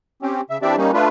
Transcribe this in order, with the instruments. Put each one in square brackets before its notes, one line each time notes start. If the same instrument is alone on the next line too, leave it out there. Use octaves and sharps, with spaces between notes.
[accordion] C4 C#4 G4
C#3 E5
E3 C4 D4 G4 D5 E5
G3 A#3 C#4 D#4
A3 D4 F4 B4